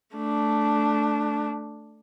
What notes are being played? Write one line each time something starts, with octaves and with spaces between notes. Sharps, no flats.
A3 D4